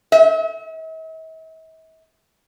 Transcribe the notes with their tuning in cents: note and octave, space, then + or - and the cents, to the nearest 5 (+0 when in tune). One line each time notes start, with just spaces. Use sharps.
E5 -45